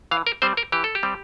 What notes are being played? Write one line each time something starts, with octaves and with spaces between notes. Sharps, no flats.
E3 F5
A#4
G3 C4 C5
A#4
E3 G4
A4
G4
G3 C4